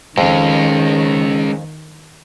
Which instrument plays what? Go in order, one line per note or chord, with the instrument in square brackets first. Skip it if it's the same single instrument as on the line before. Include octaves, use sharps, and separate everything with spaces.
[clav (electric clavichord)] F2 [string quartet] D#3 [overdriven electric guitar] G#3 C#4